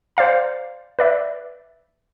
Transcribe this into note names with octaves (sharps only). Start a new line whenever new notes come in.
C5 D5 F5 A#5
B4 D5 E5